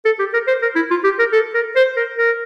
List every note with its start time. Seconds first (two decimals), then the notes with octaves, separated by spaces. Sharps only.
0.05 A4
0.19 G4
0.33 A#4
0.47 C5
0.62 A#4
0.76 E4
0.91 F4
1.04 G4
1.19 A#4
1.32 A4
1.54 A#4
1.76 C5
1.97 A#4
2.18 A#4